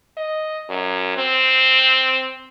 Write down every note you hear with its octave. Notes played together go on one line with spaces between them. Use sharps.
D#5
F#2
C4